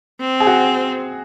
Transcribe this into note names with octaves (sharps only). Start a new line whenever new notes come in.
C4
G#4
F#4